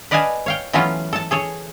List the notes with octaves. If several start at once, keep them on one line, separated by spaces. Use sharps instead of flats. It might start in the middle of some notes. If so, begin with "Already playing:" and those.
B4 D5 D#5 F5 G#5 A5
C#5 F5 G5
E3 F#3 A3 B3 C#4 F4
A4 A5
G#4 A4 C#5